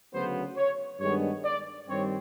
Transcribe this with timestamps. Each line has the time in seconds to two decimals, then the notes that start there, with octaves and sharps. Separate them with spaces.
0.13 D2 C#3 F#3 B3 C5
0.57 C#5
1.00 G2 D#3 G#3 B3 D4 C#5
1.45 D5
1.88 G2 D#3 G3 C4 C#5